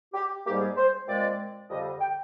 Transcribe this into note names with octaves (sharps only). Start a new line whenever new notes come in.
G4
G#2 G3 A#3 G4
G#4
C5
A#2 G#3 C4 D5
F2 D3 G3 D#5
G5